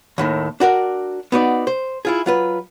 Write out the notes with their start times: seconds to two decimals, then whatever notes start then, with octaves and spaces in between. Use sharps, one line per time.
0.18 D#2 A2 D#3
0.60 D4 F#4 A#4 D5
1.32 B3 D#4 F#4 D5
1.67 C5
2.05 E4 F4 G#4
2.26 F#3 F4 B4